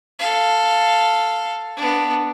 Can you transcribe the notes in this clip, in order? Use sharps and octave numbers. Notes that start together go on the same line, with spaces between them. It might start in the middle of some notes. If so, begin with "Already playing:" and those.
A4 F5
B3 D4